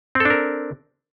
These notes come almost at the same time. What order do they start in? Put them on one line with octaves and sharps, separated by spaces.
C4 A4 D4 A#4